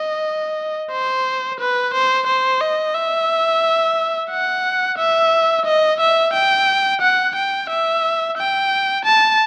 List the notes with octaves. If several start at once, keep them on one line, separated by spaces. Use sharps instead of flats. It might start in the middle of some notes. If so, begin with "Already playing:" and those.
Already playing: D#5
C5
B4
C5
C5
D#5
E5
F#5
E5
D#5
E5
G5
F#5
G5
E5
G5
A5